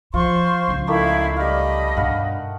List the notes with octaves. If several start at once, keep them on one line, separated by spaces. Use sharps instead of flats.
F3 F4 C5 C6 C#6
C#2 F3
D#3 A3 E4 D5 F5 B5
G3 D#5 F5 B5
G2 B2 F5 F#5